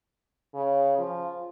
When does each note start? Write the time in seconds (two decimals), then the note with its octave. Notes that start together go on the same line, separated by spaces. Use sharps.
0.54 C#3
0.99 F3